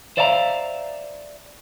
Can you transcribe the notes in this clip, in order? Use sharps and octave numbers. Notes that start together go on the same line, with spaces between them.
C5 D5 E5 F5 G#5 A#5